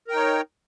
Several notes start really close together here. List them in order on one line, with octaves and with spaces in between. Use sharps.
A#4 G5 D#4 C#5